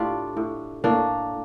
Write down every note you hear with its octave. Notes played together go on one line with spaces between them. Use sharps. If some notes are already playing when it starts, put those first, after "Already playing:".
Already playing: A2 D4 F4 G4
A2
A2 A#3 D4